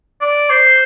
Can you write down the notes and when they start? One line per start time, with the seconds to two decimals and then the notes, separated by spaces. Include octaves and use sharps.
0.21 D5
0.50 C5